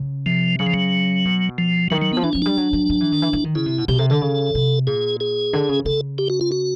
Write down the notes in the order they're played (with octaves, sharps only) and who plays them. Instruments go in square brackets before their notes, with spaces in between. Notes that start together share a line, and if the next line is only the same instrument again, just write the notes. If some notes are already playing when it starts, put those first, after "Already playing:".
Already playing: [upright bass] C#3
[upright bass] C3 [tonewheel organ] F3
[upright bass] C#3 [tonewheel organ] F#3
[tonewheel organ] F3
F#3
[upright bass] B2
[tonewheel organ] F3
[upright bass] D#3 [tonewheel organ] F#3
[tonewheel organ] F#3
[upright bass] F3 [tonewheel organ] B3
[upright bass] E3 [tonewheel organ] D4
[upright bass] F3 [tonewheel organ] C#4
[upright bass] G3 [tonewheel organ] D4
[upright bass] F#3
F#3
F#3
E3
D#3
E3
E3
D#3
[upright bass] C#3 [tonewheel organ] E4
[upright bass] C3
B2
[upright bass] B2 [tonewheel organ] G4
[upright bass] C3 [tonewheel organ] A4
[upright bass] D3 [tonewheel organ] A4
[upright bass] C#3
C3
[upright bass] A#2 [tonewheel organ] G#4
[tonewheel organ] G#4
[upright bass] D3
C#3
[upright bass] C#3 [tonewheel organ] A4
[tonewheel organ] G4
F#4
F4
F#4